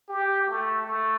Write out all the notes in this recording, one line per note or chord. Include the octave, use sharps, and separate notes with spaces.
G4
A3
A3